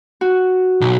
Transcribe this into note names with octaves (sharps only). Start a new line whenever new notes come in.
F#4
B1